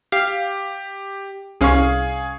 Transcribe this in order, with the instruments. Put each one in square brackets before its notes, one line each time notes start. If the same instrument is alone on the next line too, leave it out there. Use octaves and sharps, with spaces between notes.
[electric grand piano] G4 [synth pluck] F5
[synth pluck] C2 C#4 [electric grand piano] G#4 F5 C#6